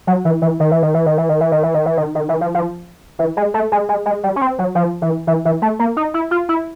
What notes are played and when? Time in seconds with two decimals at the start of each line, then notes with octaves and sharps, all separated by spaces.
0.07 F#3
0.25 E3
0.42 E3
0.60 D#3
0.71 E3
0.82 D#3
0.94 E3
1.06 D#3
1.18 E3
1.29 D#3
1.41 E3
1.52 D#3
1.63 E3
1.74 D#3
1.86 E3
1.97 D#3
2.15 D#3
2.29 E3
2.41 F3
2.54 F3
3.19 E3
3.37 G#3
3.54 A3
3.72 G#3
3.89 G#3
4.06 G#3
4.24 G3
4.36 C#4
4.41 C4
4.59 F#3
4.75 F3
5.02 E3
5.27 E3
5.45 E3
5.62 A3
5.79 A#3
5.97 D#4
6.14 E4
6.31 F4
6.49 E4